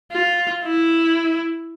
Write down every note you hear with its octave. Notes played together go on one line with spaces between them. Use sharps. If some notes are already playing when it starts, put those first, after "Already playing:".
F4
E4